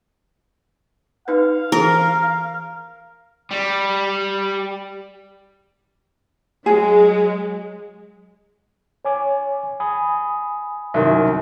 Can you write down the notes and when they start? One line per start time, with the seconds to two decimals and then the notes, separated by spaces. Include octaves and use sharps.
1.28 D#4 B4 F5
1.72 E3 G#4 A#4
3.51 G3
6.66 F#3 G#3 G#4
9.05 C#5 G#5 D6
9.80 G#5 B5 D#6
10.94 C2 F#2 D#3